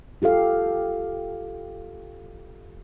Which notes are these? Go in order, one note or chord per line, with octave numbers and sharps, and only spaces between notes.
F4 G4 A4 F5